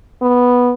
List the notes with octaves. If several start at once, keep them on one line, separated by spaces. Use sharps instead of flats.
B3